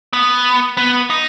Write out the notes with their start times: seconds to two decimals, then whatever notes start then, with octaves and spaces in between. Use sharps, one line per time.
0.13 B3
0.77 B3
1.10 D#4